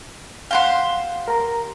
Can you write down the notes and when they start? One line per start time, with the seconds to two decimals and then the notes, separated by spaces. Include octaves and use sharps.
0.51 G4 C5 F5 F#5 C6
1.28 A#4 A#5